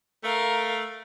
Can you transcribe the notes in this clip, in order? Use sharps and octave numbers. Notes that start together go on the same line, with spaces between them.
A3 A#4 F5